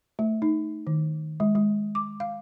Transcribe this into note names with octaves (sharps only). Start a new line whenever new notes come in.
A3
D#4
D#3
G#3
G#3
D6
F5